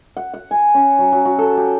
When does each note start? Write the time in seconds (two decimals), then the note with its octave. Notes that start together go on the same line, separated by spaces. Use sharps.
0.17 F#5
0.34 F#5
0.51 G#5
0.74 C#4
0.99 F#3
1.12 F#3
1.25 F#4
1.39 A4
1.57 G4